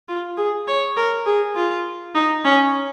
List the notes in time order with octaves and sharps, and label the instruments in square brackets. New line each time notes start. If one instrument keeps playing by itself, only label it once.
[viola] F4
G#4
C#5
A#4
G#4
F4
D#4
C#4